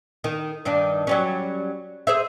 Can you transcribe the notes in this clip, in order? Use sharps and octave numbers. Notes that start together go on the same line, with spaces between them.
D#3
G2 D#3 D4
F#3 G3 C#4
G#4 C5 E5